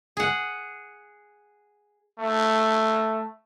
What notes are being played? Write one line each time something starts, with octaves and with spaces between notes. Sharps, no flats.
G#4 F#5
A3